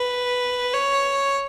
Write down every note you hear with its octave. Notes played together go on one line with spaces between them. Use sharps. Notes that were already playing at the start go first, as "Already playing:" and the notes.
Already playing: B4
C#5